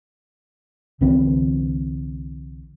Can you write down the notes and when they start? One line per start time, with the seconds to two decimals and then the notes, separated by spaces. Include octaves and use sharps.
1.01 C2 D3 E3 C4